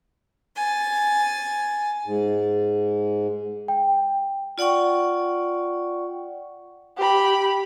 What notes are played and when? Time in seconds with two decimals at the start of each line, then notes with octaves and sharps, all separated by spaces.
0.55 G#5 A6
2.05 G#2
3.68 G5
4.58 F4 D5 F#5 G5 C#6
6.98 G4 B5